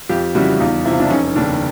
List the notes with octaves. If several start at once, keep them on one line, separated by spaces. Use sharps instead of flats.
F2 F4 G4
C#3 E3 G3 E4 F#4
E2 D#4 F4
C3 F3 E4
F4
D4 E4
F1 C#4 D#4
D#2 C#3 D4